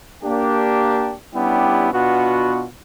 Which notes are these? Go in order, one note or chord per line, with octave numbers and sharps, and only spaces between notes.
A#3 D4 G4
G3 B3 C#4 D4 E4 G4
B2 B3 D4 F4 F#4